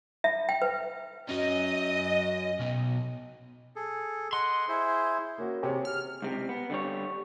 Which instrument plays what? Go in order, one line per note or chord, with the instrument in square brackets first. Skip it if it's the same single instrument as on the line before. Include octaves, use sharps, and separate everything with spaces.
[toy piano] E5
G5
B4
[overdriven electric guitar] F#3 C#4 [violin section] D#5
[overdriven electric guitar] B1 B2
[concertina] G#4 A4
[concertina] D#5 F#5 [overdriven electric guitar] C6
[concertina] E4 G#4 C5
[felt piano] A#3 C#4 F#4
[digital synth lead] C3 [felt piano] G#4 C#5 G#5
[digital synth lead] F6
[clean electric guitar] C#2 C3
B3
D3 G3 C#5